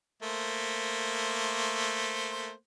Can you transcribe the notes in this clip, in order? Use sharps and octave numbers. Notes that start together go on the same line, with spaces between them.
A3 A#3 C5